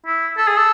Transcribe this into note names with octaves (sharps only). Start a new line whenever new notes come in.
E4
A4
G#4
A4